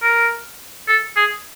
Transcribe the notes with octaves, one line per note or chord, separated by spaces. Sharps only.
A#4
A4
G#4